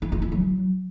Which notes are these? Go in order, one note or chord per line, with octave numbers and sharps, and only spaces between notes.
E4
F4
E4
F#3